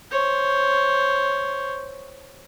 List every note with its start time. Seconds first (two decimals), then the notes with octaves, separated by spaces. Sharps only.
0.11 C5 C#5